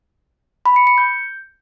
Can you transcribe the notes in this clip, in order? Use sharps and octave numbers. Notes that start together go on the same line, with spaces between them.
B5
C#7
C#7
G6